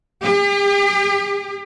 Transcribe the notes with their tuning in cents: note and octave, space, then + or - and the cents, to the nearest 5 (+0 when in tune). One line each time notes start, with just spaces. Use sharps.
G4 +45